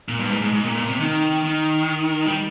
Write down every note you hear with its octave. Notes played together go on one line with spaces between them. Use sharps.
A#2
G2
G#2
G#2
G#2
A#2
A#2
C3
D#3
D#3
G3